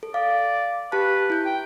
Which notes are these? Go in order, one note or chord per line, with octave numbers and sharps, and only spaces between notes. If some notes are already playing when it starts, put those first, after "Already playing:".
A4
D5 F5
G4 B4 A5
E4 G6
G5